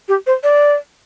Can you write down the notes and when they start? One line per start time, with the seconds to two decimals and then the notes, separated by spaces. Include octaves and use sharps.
0.08 G4
0.27 C5
0.43 D5